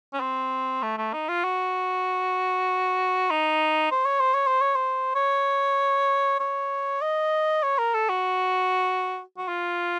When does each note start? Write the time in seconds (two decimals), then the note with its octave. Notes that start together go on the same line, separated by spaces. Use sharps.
0.13 C#4
0.20 C4
0.82 A3
0.98 A3
1.13 D#4
1.28 F4
1.44 F#4
3.31 D#4
3.91 C5
4.05 C#5
4.20 C5
4.34 C#5
4.47 C5
4.61 C#5
4.75 C5
5.15 C#5
6.40 C#5
7.01 D#5
7.63 C#5
7.78 A#4
7.94 A4
8.09 F#4
9.38 F#4
9.48 F4